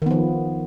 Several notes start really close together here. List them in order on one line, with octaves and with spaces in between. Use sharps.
D#3 B3 F3